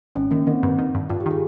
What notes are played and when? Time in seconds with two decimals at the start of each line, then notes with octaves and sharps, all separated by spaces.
0.15 G#1 C#4
0.31 D#3 A#3
0.47 D#3 C4
0.63 G2
0.78 D#3
0.95 G2
1.10 G2 F4
1.20 G4
1.26 D#3 G#4